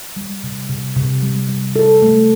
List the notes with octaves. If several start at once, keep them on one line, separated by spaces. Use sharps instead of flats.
G3
C3
C3
C3
G3
G3
A4
A3